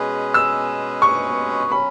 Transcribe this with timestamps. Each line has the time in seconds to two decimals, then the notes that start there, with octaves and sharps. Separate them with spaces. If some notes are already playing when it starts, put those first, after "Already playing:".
Already playing: B2 G#3 C#4 G#4 B4
0.34 E6
1.02 C#6
1.71 F#3 C#4 B5